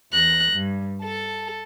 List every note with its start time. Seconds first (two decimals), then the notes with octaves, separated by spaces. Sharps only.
0.12 E2 F#6 A#6
0.52 G2
1.02 A4 A5